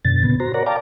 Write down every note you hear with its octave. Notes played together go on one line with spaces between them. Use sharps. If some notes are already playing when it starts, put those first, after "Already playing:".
F#2 B2 D3 A6
A#2 C#3 B3
F#4 C5 A#5
A#4 C#5 D5 F#5 A#5
D5 F5 G5 A5 A#5 D6